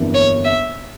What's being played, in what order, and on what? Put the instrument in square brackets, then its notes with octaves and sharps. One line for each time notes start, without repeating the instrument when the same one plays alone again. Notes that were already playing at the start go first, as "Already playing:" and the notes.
Already playing: [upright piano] G1 F2 E3 A#3 D4
[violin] C#5
E5